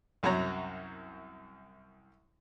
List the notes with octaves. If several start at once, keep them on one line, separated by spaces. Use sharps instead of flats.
C2 F#2 F#4 C#5 A#5